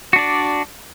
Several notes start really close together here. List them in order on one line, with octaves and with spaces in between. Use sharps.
F#4 D4 D5